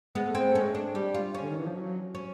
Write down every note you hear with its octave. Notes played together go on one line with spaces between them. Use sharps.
G#3 B3
A3
G#3 C4
A3
G#3 C#4
D4
G3 G4
F4
C#4
D3
D#3
E3
F3
F#3
C#4